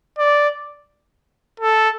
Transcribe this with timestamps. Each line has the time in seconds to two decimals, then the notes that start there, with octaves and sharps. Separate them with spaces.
0.19 D5
1.60 A4